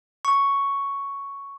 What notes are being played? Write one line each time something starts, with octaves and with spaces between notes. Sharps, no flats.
C#6